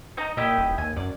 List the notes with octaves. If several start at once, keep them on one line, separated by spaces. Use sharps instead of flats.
D#4 D#5 A#5
A#2 E4 G4 D#5
D#1
D#2 G#5
F#2 D5